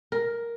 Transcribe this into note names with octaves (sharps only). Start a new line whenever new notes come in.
A#4